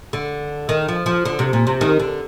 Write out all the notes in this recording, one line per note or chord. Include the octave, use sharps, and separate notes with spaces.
D3
D#3
F3
F3
D3
C3
A#2
C3
D#3
D3